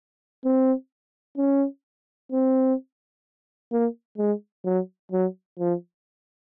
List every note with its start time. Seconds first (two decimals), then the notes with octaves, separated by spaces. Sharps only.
0.45 C4
1.38 C#4
2.32 C4
3.72 A#3
4.18 G#3
4.65 F#3
5.12 F#3
5.59 F3